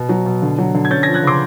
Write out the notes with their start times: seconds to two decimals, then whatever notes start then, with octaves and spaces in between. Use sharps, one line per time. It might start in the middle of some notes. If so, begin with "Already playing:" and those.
Already playing: B2
0.09 F#3
0.26 B2
0.42 D3
0.58 F#3
0.74 D3
0.85 G#6
0.91 C#4 G6 A6
1.03 F3 G#6 A#6
1.14 F#6 G#6
1.23 C#3 C6 D6